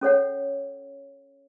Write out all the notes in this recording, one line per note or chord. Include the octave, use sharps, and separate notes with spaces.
C#4 A4 C#5 F#5